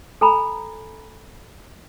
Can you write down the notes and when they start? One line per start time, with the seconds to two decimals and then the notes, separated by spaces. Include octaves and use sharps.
0.21 A4 G#5 A#5 B5